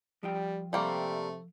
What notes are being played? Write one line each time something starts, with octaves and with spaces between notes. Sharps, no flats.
F3 G3 F4 G5
C3 G3 A3 A#3 C4